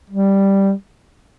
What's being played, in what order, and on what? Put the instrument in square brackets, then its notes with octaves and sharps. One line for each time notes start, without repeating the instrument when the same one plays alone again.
[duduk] G3